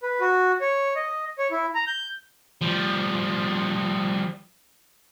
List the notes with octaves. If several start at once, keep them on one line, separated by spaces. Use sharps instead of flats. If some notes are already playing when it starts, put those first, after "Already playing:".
B4
F#4
C#5
D#5
C#5
E4
A#5
G6
F3 G3